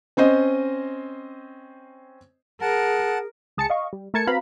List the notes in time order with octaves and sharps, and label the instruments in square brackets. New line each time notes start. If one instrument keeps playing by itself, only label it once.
[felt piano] C4 C#4 C5 D#5
[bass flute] G#4 [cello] A#4 [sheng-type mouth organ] F#5 A5
[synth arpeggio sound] C#2 G#4 A5 A6 C#7
D#5 F5 C#6
G3
A3 A#4 A5 G#6 C#7
C4 F#4 B4 F5 A#5 B5